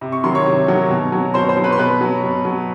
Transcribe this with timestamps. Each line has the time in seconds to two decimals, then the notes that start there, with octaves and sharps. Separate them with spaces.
0.01 C3
0.12 C#6
0.23 D#3 F#3 C6
0.35 C#5 C#6
0.46 C3
0.68 D#3 F#3
0.90 B2
1.12 F#3
1.34 B2 C5 C6
1.49 C5 C6
1.57 F#3
1.64 B4 B5
1.72 C6
1.78 B2 B4 B5
2.01 F#3
2.23 B2
2.45 F#3